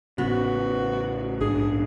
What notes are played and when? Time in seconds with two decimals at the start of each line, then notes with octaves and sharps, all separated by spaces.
0.18 A1 C#3 B3 F#4
1.41 A#1 G#2 D4 G#4